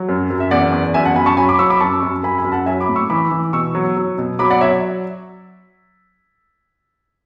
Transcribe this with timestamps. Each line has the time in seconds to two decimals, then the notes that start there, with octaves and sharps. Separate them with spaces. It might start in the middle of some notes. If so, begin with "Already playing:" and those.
Already playing: F#3
0.09 F#2
0.30 F#2
0.40 E5
0.51 E2 D5 F#5
0.72 E2
0.94 F#2 E5 G#5
1.05 F#5 A5
1.16 F#2 G#5 B5
1.26 A5 C#6
1.37 F#3 G#5 B5
1.49 B5 D6
1.59 F#3 C#6 E6
1.70 B5 D6
1.80 F#2 A5 C#6
2.03 F#2
2.23 F#2 G#5 B5
2.38 G#5 B5
2.45 F#2
2.52 F#5 A5
2.66 F#3 E5 G#5
2.81 B5 D6
2.89 A2
2.96 C#6 E6
3.10 E3 B5 D6
3.31 E3
3.53 B2 C#6 E6
3.75 F#3
3.97 F#3
4.18 B2
4.39 F#3 B5 D6
4.50 D5 F#5
4.61 F#3 C#5 E5